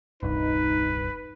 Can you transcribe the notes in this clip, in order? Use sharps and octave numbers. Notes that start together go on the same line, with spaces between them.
D#1 C2 G2 D#4 B4